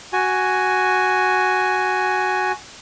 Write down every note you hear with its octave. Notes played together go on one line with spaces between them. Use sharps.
F#4 G#5